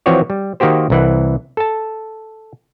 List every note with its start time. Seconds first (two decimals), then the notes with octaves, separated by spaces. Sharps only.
0.06 E3 F3 C4 F#4 C#5 D5
0.30 G3
0.60 D#3 A#3 F#4 G4 C5
0.90 C2 E3 F#5
1.57 A4 A5